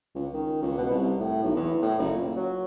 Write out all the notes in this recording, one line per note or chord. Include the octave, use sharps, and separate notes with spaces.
C#2
D#3
C#2
B2
C2
A2
B1
E2
A2
F#1
A#2
F#3